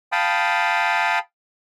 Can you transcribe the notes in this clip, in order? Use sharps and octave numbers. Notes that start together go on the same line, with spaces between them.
F5 G5 A5 B5 D#6